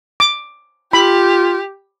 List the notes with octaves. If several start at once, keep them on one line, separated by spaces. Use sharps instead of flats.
D6
F4 G4 B5